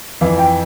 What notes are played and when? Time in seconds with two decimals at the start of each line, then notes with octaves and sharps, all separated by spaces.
0.21 F2 E3 F5
0.38 G5